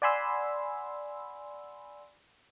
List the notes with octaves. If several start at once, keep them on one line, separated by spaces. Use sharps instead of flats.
D5 F#5 G#5 B5 C6 E6